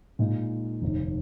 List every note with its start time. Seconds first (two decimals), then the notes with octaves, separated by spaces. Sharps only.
0.19 A#2 G#3 D#4
0.82 F1 D#2 D#3